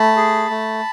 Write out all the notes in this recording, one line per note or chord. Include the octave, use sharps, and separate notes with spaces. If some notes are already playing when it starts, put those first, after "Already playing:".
Already playing: A3 A5 B5
G#4
A3